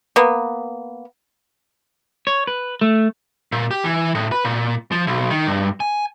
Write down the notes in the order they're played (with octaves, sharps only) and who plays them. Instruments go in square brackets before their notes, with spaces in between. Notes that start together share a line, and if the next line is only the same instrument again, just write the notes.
[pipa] A#3 B3
[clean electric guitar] C#5
B4
A3
[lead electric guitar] A#2
G4
E3
A2
B4
A#2
F3
B1
D#3
G2
G#5